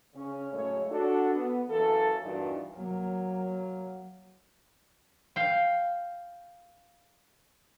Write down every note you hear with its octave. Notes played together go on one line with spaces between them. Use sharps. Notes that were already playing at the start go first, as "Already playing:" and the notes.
C#3 C#4
F#2 A2 C#3 G#3 A3 C#5
D4 F#4 A4
B3
F#2 E3 A#3 A4
E2 G2 A#2 E3 D#4 F#4
F#3 A#3
F5 G5